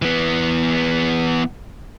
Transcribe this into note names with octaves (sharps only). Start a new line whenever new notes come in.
E3 B3